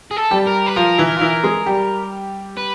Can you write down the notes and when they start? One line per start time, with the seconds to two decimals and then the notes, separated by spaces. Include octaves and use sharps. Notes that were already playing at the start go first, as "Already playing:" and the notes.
0.11 G#4
0.16 A4
0.31 G3 G4
0.46 A#4
0.66 B4
0.76 F3 F4 A#4
0.98 E3 E4
1.17 F4
1.21 E3 E4
1.44 G#3 G#4
1.66 G3 G4
2.57 B4